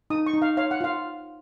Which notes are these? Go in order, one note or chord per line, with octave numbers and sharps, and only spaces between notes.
D#4 D#6
C#6
D#4
F5
C#5 F5
F#5
F4 F5